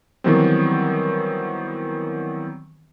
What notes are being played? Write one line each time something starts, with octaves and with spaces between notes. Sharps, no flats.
D#3 E3 F#3 G3 B3 C4